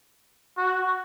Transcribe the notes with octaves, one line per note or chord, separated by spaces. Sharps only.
F#4